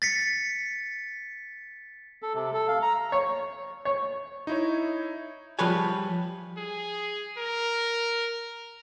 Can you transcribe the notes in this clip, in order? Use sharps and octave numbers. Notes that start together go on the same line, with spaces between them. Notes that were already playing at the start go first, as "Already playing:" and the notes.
A6 B6 C#7
A4
C3
A4
F5
A#5
C#5
C#5
D#4 E4 C#5
F3 G3 G#4 B4 C#5 G#5
G#4
A#4